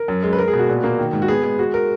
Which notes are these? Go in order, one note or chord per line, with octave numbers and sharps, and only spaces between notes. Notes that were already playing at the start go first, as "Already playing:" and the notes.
Already playing: A#4
F#2
G#3
B4
G#3 A#4
G#4
B2
F#4
A#2
A#3
D#3
G#2
F#4
B3 G#4
G#3 G#4
G#3 F#4
A#4